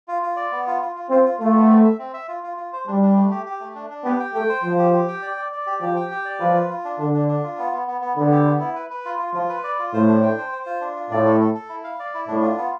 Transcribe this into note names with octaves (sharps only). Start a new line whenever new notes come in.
F4
F4
D5
B3
F4
F4
F4
C4 F4
F4
A3 F4
B3
C4
E5
C4
E5
F4
F4
F4
C5
G3 D4
D4
A3
G4
G4
A3
D4
D4
B3 G4
G5
A3 G5
C5
F3 C5
G4
G4
G5
D5
D5
D5
G4
F3 G4
G5
G4
D5
F3 B4
F4
F4
D4
D3 D4
D4
D4
F4
B3
B3
B3
B3
D3 B3
G4
B3
E4
B4
B4
F4
F4
F3 F4
B4
D5
F4
A2 C5
D4
G5
C5
C5
F4
D4
F4
A2 D5
A4
A4
A4
E4
F5
D5
E4
A2 D4
F4
B3